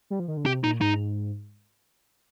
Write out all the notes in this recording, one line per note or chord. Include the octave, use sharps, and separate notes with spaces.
G3
F3
D#3
D3
C3 G4
A#2 D#4
G#2 D#4